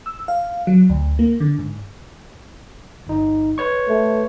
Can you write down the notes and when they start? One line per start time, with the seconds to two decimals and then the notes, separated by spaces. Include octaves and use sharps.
0.06 E6
0.28 F5
0.67 F#3
0.90 D2
1.19 A#3
1.40 D3
1.59 G#2
3.07 G1 D#4
3.58 B4 C#5 C#6
3.89 A3